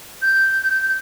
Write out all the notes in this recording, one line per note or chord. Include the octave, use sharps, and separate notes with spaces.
G6